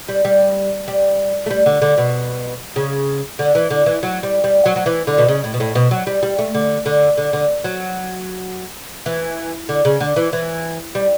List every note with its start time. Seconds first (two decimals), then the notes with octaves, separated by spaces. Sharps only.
0.09 G3
0.25 G3
0.88 G3
1.46 A3
1.51 G3
1.66 D3
1.82 D3
1.98 B2
2.76 C#3
3.39 D3
3.55 E3
3.71 D3
3.86 E3
4.03 F#3
4.23 G3
4.44 G3
4.66 F#3
4.76 F#3
4.86 E3
5.07 D3
5.18 B2
5.28 C#3
5.44 A2
5.54 B2
5.60 A2
5.75 B2
5.91 F#3
6.07 G3
6.23 G3
6.39 A3
6.54 D3
6.86 D3
7.17 D3
7.33 D3
7.64 F#3
9.06 E3
9.69 D3
9.85 C#3
10.00 D3
10.16 E3
10.33 E3
10.95 G3